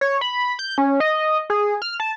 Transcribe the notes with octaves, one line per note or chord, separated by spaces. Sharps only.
C#5
B5
G6
C#4
D#5
G#4
F6
A5